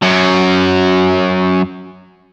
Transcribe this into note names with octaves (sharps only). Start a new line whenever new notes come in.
F#2 F#3